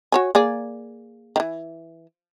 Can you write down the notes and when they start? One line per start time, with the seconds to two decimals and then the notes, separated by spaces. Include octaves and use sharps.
0.12 F#4 C#5 G#5
0.35 A#3 G#4 D5
1.36 D#3 E3